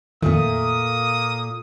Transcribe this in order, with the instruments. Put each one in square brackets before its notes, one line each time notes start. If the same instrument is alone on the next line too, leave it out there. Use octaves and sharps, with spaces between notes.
[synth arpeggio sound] F2 D#3 [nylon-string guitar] A#2 A3 [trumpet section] A#3 D#6